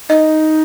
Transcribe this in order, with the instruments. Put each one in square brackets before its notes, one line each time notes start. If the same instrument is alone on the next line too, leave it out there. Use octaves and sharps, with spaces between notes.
[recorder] D#4 [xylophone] D#5